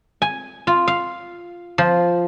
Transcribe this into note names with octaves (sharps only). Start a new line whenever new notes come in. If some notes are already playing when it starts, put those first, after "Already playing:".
G#5
F4
F5
F3